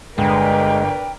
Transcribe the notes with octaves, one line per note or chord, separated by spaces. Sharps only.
G1 G#3 A#4 B4 D5 G5